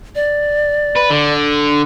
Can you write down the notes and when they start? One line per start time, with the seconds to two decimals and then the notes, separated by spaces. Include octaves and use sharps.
0.15 D5
0.96 B4
1.11 D3